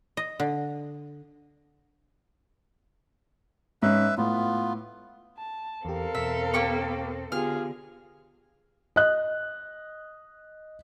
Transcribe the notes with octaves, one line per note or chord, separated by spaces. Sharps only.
D#5
D3
G#2 C#4 B4 E5
A2 B3 F4
A5
E2 C4 G4 A4 A#4 F5
E2 B2 E5
A#3 G4 C#6
D3 B3 F4 G4 G#4 F6
D#5 F#6